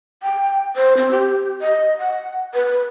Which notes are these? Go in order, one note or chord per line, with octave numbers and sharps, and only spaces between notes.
G5
C5
C4
G4
D#5
F#5
B4